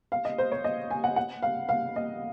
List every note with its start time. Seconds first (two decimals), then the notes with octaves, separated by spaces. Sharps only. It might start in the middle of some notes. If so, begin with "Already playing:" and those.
0.12 F5
0.25 D#5
0.38 C5
0.52 C#5
0.64 D#5
0.91 G#5
1.04 F#5
1.16 F#5
1.42 F5
1.69 F5
1.96 D#5